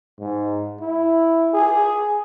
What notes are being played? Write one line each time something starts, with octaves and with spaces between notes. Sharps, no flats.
G#2
E4
G#4